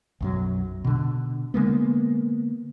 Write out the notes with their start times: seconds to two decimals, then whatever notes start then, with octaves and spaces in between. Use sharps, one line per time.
0.20 B1 F#2 F#3
0.85 B2 D3
1.54 D3 G#3 A#3 B3